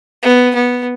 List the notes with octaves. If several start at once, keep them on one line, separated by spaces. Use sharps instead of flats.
B3
B3